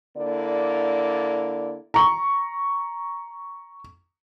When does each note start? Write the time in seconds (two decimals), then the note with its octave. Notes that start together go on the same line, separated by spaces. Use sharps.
0.17 D3 A#3 E4 D5
1.94 A#5 C#6